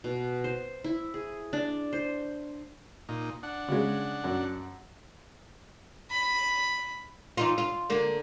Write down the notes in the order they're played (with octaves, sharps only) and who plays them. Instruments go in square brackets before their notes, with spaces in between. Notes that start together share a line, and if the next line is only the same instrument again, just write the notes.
[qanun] B2
C5
E4
G#4
D4
C5
[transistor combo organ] A#2 D#4
D4 F#5
[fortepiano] C#3 G#3
F#2
[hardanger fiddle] B5
[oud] E3 D#4 F4
F4
D3 A#3